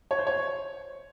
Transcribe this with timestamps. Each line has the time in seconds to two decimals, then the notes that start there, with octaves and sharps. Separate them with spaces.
0.11 C#5
0.19 C5
0.27 C#5